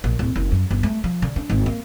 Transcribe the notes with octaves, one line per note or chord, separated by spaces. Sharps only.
A#1
D1
F#1
F#2
G1
A3
F3
D3
D4
G#1
A#3